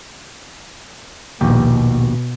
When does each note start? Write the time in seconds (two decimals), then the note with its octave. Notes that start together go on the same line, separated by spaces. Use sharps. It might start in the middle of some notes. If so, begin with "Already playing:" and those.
1.41 A#1 D#2 B2 G4